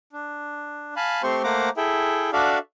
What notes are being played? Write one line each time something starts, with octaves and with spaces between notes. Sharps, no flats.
D4
F5 G#5 A5 B5
A3 C4 G4 C5 C6 C#6
A3 A#3 C5 F#5 A#5 D6
E4 G#4 A4 E5 G5
D4 F#4 A4 D5 E5 F5